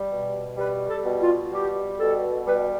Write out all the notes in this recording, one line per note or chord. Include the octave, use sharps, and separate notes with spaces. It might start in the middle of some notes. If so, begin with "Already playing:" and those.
Already playing: G3
B2
G3 B4
A4
B2
F4
G3 G4
B2 A4
G3 B4